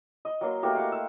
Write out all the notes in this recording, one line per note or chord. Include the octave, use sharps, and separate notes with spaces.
D#5
F#3 A#3 C6
A3 A#3 F#4 G4
F5 F#5
E6